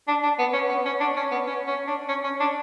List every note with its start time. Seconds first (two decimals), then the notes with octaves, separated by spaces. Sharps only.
0.08 D4
0.23 D4
0.39 B3
0.53 C#4
0.69 B3
0.85 C#4
1.00 D4
1.16 C#4
1.31 B3
1.47 C#4
1.67 C#4
1.87 D4
2.09 C#4
2.24 C#4
2.40 D4